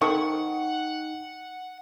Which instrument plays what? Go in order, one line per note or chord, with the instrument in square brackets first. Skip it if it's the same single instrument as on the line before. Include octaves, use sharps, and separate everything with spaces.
[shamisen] D#3 C4 A4 [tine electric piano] D#4 G5 [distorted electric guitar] F#5 [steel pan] C#6